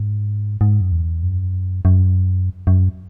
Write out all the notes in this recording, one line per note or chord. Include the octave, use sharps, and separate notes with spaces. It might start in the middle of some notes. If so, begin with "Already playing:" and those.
Already playing: G#2
G#2
F#2
E2
F#2
F#2
F#2